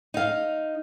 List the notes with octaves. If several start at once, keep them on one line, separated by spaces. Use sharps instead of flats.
D#4 F5